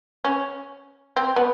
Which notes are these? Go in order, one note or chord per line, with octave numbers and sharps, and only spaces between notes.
C#4
C4
B3